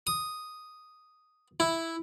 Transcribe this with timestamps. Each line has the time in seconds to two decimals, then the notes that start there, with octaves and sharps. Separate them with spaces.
0.07 D#6
1.60 E4